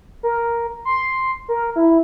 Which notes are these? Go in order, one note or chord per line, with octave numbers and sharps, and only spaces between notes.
A#4
C6
A#4
E4